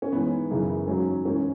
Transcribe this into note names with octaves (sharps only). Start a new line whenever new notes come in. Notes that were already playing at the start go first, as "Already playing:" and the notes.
C#4
G#2 E3 B3
F#2 C#3 E3
G#2 F#3 C#4
G#2 E3 C#4